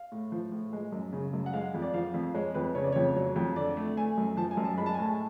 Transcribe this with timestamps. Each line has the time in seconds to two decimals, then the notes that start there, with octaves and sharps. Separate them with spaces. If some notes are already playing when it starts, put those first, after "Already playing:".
Already playing: F5
0.12 A2
0.32 F3
0.51 A2
0.73 G#3
0.92 F#2
1.13 C#3
1.33 F#2
1.46 F#5
1.53 G#3 F5
1.74 F2
1.82 D5
1.94 F3 F5
2.14 F2
2.34 G#3 C#5
2.54 F2 B4
2.75 C#3 C#5
2.84 D5
2.92 F2 C#5
3.16 F#3 C#5
3.36 F2
3.56 D3 D5
3.77 A3
3.97 A3 G#5
4.17 F#2
4.37 F3 A5
4.51 G#5
4.57 F#2
4.64 A5
4.77 G#3 B5
4.86 A5
4.94 G#5
4.98 A2 A5